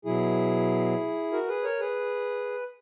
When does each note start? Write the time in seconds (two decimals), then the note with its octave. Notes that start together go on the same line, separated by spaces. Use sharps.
0.05 B2 F#3 E4 G#4
1.32 F#4 A#4
1.48 G#4 B4
1.64 A#4 C#5
1.80 G#4 B4